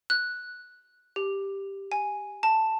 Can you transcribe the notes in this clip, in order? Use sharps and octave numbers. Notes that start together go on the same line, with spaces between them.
F#6
G4
G#5
A5